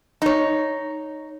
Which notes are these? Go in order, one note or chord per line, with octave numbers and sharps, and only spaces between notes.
D#4 C#5